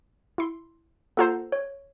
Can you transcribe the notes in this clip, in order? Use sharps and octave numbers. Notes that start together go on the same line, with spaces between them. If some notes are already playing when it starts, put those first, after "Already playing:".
E4 C6
A#3 F4 A4 C5 F#5 A#5
C#5